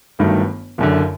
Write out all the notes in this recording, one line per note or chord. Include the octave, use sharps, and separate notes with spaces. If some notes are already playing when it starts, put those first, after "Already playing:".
G1 G2 D#3 F#3 A3
F#1 F#2 D3